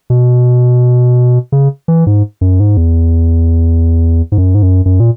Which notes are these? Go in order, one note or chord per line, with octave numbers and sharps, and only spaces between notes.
B2
C#3
E3
G#2
F#2
G#2
E2
G#2
F#2
G#2
F#2
F#2
A#2